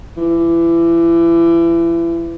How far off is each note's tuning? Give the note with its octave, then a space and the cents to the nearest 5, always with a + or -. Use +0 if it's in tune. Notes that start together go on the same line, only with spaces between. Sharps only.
E3 +30